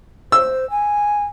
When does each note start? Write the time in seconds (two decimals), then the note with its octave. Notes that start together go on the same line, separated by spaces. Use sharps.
0.32 C5 E6
0.70 G#5